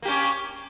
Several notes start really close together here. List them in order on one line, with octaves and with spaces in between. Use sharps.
A#3 G4 C#4